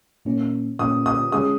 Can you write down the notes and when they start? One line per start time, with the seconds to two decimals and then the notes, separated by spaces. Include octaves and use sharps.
0.25 A#2 A#3 C#4
0.79 A#2 A#3 C#4 D#6
1.06 D#6
1.32 C#3 G#3 C#4 G#4 D#6